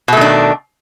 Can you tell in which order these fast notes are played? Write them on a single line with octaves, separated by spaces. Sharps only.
B2 A3 D#3 D4